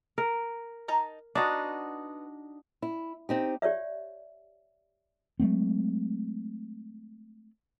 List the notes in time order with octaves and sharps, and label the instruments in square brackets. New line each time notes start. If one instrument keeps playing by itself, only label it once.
[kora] A#4
[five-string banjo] D#4 A5 A#5
[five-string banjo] B3 [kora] D4 D#4 F#4
[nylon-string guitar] E4
C4 D#4 G4
[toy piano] G4 C#5 D5 E5
[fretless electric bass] F#3 G#3 A3 C4